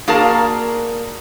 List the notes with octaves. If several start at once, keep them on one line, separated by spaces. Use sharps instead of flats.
A#3 F#4 G#4 A#4 D5 A5